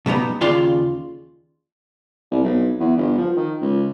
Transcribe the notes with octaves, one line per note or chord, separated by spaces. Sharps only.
B2 G3 B3 D#4
D#2 C#3 F4 D5 C6
C2
B1
E2
G1
F3
D#3
C#2